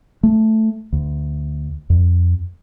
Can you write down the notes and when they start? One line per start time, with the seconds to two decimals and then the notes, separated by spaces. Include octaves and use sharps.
0.23 A3
0.93 D2
1.90 F2